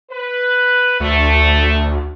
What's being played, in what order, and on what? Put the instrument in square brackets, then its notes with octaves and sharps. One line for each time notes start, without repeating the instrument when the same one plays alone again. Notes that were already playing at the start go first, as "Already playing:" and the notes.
[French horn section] B4
[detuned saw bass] D2 [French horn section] A3